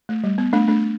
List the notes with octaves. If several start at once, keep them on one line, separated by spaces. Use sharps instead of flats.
A3
G3
B3
A3 D4
A3 D4